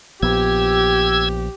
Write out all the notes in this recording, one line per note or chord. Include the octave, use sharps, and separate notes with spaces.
A#1 F3 B3 G4 E6 G#6